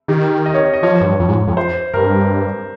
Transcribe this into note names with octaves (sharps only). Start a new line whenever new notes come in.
D#3 G4
D#5
C#5
C#5
D#5
F3 C#5
G2
F2
G#2
F2
C5
G2 A#4